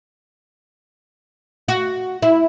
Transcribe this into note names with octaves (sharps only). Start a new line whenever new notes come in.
F#4
E4